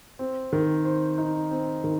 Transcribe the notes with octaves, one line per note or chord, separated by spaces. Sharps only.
C4
D#3
C5
D#4
C4
D#3